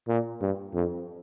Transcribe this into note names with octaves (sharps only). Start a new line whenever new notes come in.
A#2
G2
F2